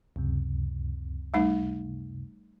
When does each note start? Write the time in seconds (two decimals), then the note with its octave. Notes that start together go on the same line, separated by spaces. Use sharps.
0.16 C#2 F#2 C3
1.34 G3 A3 D#4